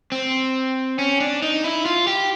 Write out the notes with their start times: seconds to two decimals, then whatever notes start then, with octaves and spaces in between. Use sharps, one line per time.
0.12 C4
0.99 C#4
1.20 D4
1.42 D#4
1.64 E4
1.86 F4
2.07 G4